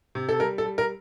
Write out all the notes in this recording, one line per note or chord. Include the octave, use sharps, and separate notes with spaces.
C3
A4
G3 A#4
A4
G3
A#4